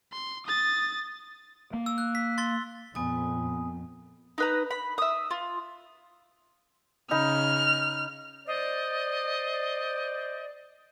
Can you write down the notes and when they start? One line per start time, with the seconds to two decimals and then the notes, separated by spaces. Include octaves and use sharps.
0.12 C6
0.46 D#6 A6
1.74 A#3
1.86 E6
1.98 F#6
2.15 B6
2.38 C6 A6 G7
2.95 F2 A#2 B3 G#5 D#6
4.38 D#4 B4 A#5
4.71 B5
4.98 E5 D#6
5.31 F4
7.11 C#3 D#4 B5 F6
8.47 C5 D5 D#5